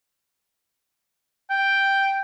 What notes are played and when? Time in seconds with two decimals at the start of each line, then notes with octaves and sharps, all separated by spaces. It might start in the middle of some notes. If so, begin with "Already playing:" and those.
1.50 G5